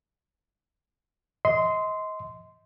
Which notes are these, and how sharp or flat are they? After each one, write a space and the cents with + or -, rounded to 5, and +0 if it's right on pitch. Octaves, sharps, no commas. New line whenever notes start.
D#5 +30 C6 -15